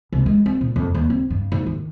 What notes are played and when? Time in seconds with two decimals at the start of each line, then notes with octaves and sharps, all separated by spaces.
0.13 C2
0.26 G#3
0.46 C4
0.61 A#2
0.76 F2
0.94 D#2
1.10 C4
1.30 G2
1.52 G#2
1.66 D#3